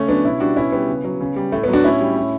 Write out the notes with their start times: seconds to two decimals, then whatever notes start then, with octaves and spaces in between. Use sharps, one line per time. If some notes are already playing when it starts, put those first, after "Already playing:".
Already playing: C#3 A3 C#4
0.08 F#3 B3 D4
0.24 B2 C#4 E4
0.40 G3 D4 F#4
0.56 B2 C#4 E4
0.72 G3 B3
0.88 C#3
1.04 F#3
1.21 C#3
1.36 G3
1.52 A2 A3
1.64 B3
1.68 F#3
1.73 D4 F#4
1.84 A2 C#4 E4
2.00 G3
2.16 A2